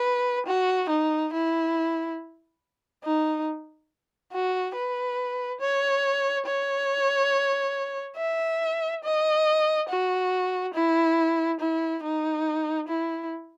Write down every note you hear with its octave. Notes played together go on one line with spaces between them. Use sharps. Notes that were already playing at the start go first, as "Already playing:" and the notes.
Already playing: B4
F#4
D#4
E4
D#4
F#4
B4
C#5
C#5
E5
D#5
F#4
E4
E4
D#4
E4